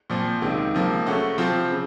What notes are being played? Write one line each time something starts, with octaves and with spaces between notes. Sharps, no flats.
A#2 F3 C4
C#2 C3 D#3
C#2 C3 F3 A#3
C#3 A3 C#4 F#4
C3 F3 C4 F4
C#3